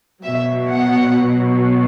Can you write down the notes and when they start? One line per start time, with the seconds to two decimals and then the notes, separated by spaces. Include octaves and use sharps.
0.23 B2 F#3 E5
0.70 F#5